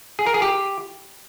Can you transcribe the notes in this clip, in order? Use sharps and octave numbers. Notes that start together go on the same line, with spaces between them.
G#4
A#4
G#4
G4